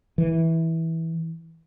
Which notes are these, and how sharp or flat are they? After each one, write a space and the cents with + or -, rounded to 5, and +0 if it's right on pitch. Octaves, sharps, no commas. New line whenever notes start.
E3 -15